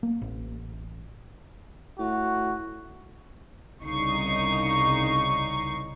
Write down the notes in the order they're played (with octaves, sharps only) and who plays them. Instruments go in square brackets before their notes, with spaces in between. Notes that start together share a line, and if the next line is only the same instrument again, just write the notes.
[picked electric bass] A#3
A1
[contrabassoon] A2 [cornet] F#4
[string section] C2 C#3 D#4 C#6 C7